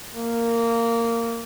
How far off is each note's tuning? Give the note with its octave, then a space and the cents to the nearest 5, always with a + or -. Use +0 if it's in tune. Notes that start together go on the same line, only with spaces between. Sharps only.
A#3 -15